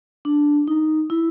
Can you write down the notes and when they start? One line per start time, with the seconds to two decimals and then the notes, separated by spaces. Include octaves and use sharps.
0.25 D4
0.68 D#4
1.10 E4